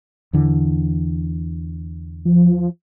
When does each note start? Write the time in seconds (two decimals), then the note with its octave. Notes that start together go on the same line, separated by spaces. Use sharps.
0.33 E2 D3 E3
2.25 F3